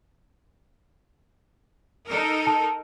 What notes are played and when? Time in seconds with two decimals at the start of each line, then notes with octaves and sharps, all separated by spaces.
2.07 D#4 A4 A#4
2.47 A5